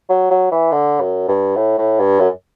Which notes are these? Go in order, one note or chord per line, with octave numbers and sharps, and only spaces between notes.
F#3
F#3
E3
D3
F#2
G2
A2
A2
G2
F#2